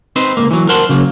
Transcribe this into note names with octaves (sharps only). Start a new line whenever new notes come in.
C4 D#4 B4 C5
C#2 A#2 A#3
E3 F#3
A#4 C5 F#5 A5 C6
C#3 F#3 A#3